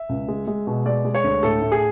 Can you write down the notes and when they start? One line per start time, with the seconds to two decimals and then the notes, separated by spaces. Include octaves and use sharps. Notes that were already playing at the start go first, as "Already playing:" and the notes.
Already playing: E5
0.09 C#2
0.28 G#3
0.47 G#3
0.67 B2
0.86 G#3 D5
1.05 G#3
1.15 C#5
1.24 D2
1.43 A2 A4
1.62 A2
1.72 G#4